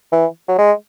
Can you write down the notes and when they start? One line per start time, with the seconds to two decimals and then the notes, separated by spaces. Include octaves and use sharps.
0.12 E3
0.49 F#3
0.58 G#3